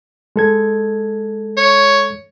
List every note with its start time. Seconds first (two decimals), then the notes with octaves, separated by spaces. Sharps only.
0.36 G#3 A4 G#6
1.57 C#5